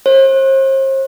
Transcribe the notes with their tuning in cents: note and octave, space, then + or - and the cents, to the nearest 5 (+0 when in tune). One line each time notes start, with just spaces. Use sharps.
C5 +40